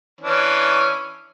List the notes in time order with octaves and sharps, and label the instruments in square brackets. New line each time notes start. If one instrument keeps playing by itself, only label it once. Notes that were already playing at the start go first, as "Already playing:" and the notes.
[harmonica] E3 C#4 D4